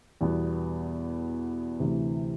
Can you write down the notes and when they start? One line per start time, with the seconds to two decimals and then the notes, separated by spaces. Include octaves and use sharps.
0.21 E2 B2 G3 B3
1.80 D2 C3 E3